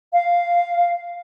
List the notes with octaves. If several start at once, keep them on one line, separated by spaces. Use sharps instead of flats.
F5